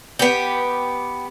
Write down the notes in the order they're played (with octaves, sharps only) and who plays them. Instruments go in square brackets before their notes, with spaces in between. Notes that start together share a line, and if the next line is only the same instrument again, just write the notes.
[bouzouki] B3 G4